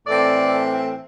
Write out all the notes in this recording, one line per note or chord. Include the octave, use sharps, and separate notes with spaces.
A2 E3 C4 A4 D5